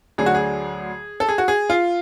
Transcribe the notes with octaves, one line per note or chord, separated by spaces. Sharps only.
D2 D3 F#3 G#4
F#4
G#4
A4
G#4
F#4
G#4
F4